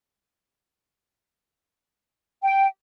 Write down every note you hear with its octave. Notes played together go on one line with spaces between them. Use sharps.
G5